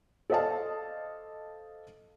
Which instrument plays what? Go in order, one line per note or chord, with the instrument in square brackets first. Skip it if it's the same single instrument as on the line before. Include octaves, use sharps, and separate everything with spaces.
[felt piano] A4 C5 D5 D#5 F5 A5